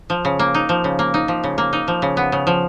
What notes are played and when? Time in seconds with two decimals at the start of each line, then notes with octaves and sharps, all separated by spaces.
0.10 F3
0.25 C#3
0.39 A#3
0.54 D#4
0.69 F3
0.84 C#3
0.99 A#3
1.14 D#4
1.28 F3
1.44 C#3
1.58 A#3
1.73 D#4
1.88 F3
2.02 C#3
2.17 B3
2.32 C#3
2.47 F3